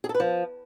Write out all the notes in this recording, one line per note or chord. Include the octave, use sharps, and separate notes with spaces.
G#4
A4
B4
F3